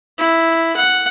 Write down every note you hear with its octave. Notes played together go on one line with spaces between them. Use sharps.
E4
F#5